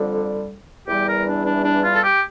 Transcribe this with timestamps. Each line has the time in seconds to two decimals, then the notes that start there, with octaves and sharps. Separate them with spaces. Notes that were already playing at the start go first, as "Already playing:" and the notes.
Already playing: F2 D3 G3
0.87 E2 E3 G3 G4
1.06 A#4
1.25 D4
1.45 D4
1.64 D4
1.83 F4
1.93 A4
2.02 G4